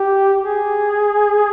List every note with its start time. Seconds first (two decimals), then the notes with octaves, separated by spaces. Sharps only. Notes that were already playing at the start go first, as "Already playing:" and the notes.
Already playing: G4
0.41 G#4